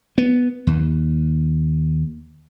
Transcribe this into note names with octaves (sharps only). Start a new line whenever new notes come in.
B3
D#2